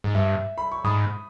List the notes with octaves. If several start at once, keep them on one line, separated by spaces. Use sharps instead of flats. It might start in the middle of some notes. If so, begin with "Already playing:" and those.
G#2
G2 E5
B5
C#6
G#2 B5 D#6